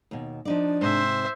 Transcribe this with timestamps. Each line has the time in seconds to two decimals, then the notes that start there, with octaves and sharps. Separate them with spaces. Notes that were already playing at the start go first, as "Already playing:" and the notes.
0.11 D#2 B2
0.45 F3 D4 D#4 D5
0.81 G#2 C3 C5 E5